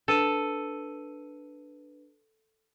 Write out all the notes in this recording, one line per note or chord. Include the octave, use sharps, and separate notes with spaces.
D4 A4 B4 D#7